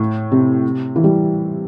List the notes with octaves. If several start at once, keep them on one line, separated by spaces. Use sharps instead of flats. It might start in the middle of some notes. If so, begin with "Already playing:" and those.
Already playing: A2
C3
E3
G3